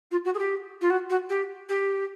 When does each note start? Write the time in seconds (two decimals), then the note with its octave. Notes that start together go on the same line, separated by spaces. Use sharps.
0.11 F4
0.24 F#4
0.34 G#4
0.38 G4
0.81 F4
0.90 F#4
1.09 F#4
1.29 G4
1.68 G4